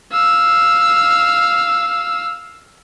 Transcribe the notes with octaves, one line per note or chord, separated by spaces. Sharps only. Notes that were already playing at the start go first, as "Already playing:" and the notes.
F5 E6